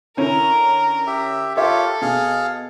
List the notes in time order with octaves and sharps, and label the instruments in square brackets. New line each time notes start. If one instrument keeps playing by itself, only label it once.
[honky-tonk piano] D3 C#4 E4 [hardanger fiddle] A#4
[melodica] G4 E5
[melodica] F4 G4 C#5 [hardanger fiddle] A4 [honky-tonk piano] A#4 E5
[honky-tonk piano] B2 [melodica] G#4 F5